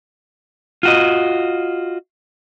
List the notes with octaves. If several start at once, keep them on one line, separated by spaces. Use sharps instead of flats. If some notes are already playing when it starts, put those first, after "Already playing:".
F4 F#4 D#5